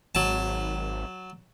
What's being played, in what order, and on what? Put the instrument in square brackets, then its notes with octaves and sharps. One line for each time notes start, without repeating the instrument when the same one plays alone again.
[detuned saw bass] G#1 [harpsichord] F#3 A5